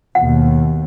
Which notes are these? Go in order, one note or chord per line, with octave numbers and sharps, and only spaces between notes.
D#2 B2 F#5